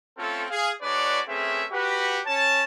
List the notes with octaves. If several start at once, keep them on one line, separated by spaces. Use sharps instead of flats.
A3 C4 C#4 F4 A4
G#4 F5
G#3 D4 F#4 B4 C#5 D5
A3 C4 C#4 G#4 B4 E5
F#4 G4 B4
C#4 C#5 A5